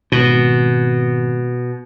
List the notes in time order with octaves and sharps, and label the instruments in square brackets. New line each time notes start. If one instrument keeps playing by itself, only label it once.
[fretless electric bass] G#1 [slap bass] B2